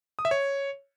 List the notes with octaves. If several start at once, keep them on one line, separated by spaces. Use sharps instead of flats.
D#6
E5
C#5